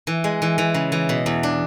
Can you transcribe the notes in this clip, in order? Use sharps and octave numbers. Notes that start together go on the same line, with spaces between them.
E3
G#3
E3
E3
C#3
E3
B2
E2
D4